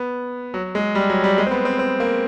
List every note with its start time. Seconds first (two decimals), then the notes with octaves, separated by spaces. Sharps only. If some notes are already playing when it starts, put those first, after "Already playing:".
Already playing: B3
0.54 F#3
0.75 G#3
0.95 G3
1.10 F#3
1.24 G3
1.38 G#3
1.47 C4
1.51 B3
1.65 C4
1.79 C4
2.00 A#3